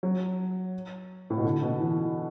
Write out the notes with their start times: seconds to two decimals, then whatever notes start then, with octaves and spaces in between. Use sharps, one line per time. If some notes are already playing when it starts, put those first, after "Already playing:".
0.03 F#3
1.30 A2
1.37 B2
1.45 D3
1.62 B2
1.80 E3